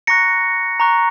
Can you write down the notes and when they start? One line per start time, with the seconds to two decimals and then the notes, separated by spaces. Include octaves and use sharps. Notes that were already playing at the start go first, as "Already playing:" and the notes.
0.07 A#5 C#6 F#6 A#6 C#7
0.80 A#5 C#6 F#6